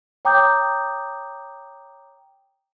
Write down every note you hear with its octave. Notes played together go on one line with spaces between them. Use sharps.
C#5 G5 A#5 D6 D#6 G6